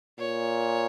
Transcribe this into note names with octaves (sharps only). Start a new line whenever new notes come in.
A#2 C#5